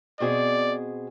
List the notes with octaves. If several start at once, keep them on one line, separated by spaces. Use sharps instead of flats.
B2 C4 G#4 D5